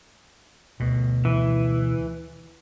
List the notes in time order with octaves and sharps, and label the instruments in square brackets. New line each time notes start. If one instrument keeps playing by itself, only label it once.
[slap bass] D2 B2
[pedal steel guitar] E3